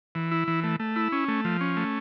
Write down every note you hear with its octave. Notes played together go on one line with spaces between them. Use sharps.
E3
E4
E3
A3
A3
E4
C#4
A3
F3
C#4
A3